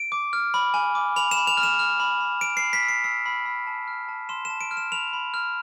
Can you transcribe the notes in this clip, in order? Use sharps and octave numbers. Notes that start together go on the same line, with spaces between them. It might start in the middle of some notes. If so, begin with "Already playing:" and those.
Already playing: D7
D6
F6
B5
G#5
D6
B5 F7
E7
B5
F7
F6
E7
F6
B5
B5
B5 D7
C7
B5
B6
E6
C7
E6 C7
B5
B5
A5
F6
A5
C6 E7
E7
A5
D7
F6
E7
B5 F7
B5
F6